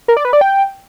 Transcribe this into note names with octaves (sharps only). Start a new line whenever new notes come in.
A#4
D5
B4
D5
G5